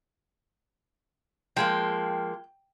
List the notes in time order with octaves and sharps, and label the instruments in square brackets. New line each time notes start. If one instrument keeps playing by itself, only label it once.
[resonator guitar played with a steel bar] F3 G#3 A#3 [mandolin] G5